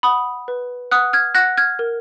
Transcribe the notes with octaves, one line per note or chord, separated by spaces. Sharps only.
F#5 B5 D#6
B4
F#5 D#6 F#6
F6 G#6
F#5 F#6 A#6
F6 G#6
A#4